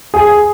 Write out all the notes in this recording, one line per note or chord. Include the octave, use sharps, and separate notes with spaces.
G#4